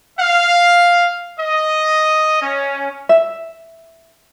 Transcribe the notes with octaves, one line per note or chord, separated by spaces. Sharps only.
F5
D#5
C#4
E5